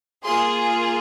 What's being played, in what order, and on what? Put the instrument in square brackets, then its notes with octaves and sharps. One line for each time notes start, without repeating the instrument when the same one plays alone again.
[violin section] A#3 F4 G#4 C6